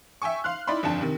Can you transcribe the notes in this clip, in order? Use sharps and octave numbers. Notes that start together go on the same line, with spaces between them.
E5 G5 G#5 C#6
F5 C6 F6 F#6
D#4 E4 D5 E5 B5 C6
G1 F2 D4 A5
C3 D#3